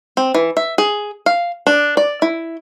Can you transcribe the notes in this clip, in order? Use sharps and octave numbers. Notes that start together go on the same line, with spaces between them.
C4
E3
E5
G#4
F5
D4
D5
E4